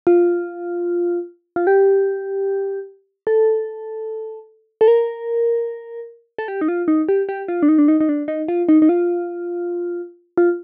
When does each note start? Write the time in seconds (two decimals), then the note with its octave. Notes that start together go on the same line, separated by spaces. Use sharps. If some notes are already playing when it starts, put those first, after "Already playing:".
0.07 F4
1.56 F4
1.67 G4
3.27 A4
4.81 A4
4.88 A#4
6.38 A4
6.48 G4
6.61 D#4
6.68 F4
6.88 D#4
7.09 G4
7.29 G4
7.48 F4
7.63 D4
7.68 D#4
7.79 D4
7.88 D#4
8.01 D#4
8.09 D4
8.28 D#4
8.48 F4
8.69 D#4
8.82 D#4
8.89 F4
10.37 F4